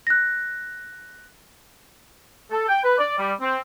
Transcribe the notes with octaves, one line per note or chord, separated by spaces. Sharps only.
F#6 A#6
A4
G5
B4
D5
G3
C4